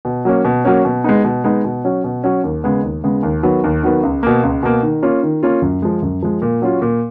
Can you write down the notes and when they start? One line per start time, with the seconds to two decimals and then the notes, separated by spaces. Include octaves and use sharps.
0.05 B2
0.25 F#3 A#3 C#4
0.45 B2
0.65 F#3 A#3 C#4
0.85 B2
1.04 G#3 B3 D#4
1.24 B2
1.44 G#3 B3 D#4
1.64 B2
1.85 F#3 C#4
2.04 B2
2.24 F#3 C#4
2.44 D#2
2.64 C#3 G#3 B3
2.83 D#2
3.04 C#3 G#3 B3
3.23 D#2
3.43 D#3 F#3 B3
3.64 D#2
3.83 D#3 F#3 B3
4.03 C#2
4.23 B2 A#3
4.43 C#2
4.63 B2 A#3
4.83 D#3
5.02 A#3 C#4 F4
5.23 D#3
5.43 A#3 C#4 F4
5.62 F#2
5.82 F3 G#3
6.02 F#2
6.23 F3 G#3
6.42 A#2
6.62 F#3 C#4 F4
6.82 A#2